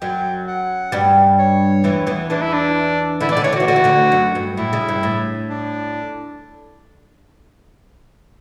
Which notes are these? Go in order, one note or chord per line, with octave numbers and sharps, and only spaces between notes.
F#2 F#3 G5
F#5
G2 G3
C#5
E2 E3
E2 E3
E2 E3 D4
E4
D4
D3 E4
E3
D5
D3
E3 C#5
D3
F#4
E3
D3 F#4
E3
D2 D3
F#2
G2
A2 E4
C#3
G2
A2
D4